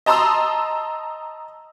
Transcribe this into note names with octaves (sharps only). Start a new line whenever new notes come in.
D#5 A5 A#5 C6 D#6 E6